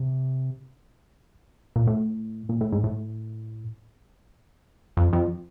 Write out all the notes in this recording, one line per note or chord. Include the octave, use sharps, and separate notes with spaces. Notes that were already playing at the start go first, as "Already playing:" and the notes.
Already playing: C3
A#2
A2
A#2
A2
G#2
A2
F2
F2